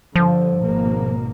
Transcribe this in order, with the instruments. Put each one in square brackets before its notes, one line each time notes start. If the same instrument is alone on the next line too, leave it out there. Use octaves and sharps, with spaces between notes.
[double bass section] G2 D3 [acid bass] F3
[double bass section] G#1 B2 A#3